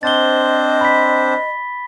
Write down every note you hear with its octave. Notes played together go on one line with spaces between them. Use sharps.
C4 D4 C5 D#5 A6 G7
B5 B6